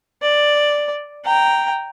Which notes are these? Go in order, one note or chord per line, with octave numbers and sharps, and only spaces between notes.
D5
G5 A#5